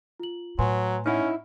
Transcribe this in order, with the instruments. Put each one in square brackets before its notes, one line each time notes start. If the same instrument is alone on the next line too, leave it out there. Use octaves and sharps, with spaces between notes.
[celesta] F4 F#7
[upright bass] A2 [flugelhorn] F#3 [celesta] B4 G#5 C6
[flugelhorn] C#4 [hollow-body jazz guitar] D#4 E4 [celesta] F#5 F6